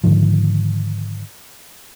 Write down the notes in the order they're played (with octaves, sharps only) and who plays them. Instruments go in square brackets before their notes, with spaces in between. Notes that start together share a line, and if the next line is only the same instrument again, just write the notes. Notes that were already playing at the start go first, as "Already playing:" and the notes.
[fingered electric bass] G#2 D3 D#3 F3